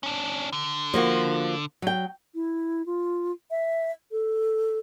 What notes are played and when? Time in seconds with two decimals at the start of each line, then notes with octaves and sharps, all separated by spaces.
0.03 C#4 D4
0.53 D3
0.94 F3 A#3 F#4
1.82 F#3 G5
2.35 E4
2.86 F4
3.51 E5
4.11 A4